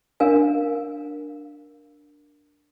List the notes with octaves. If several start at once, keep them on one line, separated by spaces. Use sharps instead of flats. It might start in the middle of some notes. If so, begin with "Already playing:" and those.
D4 A#4 F5 G#5